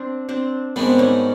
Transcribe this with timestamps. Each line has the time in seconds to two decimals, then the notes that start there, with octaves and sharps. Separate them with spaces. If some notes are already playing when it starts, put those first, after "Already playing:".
Already playing: C4 D4
0.29 C4 D4
0.76 G#2 D#3 G3 B3 C4 D4
0.99 C#4 D#4